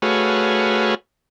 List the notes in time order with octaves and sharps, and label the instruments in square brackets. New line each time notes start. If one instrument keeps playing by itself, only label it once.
[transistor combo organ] A3 F#4 G#4 B4 C#5 F5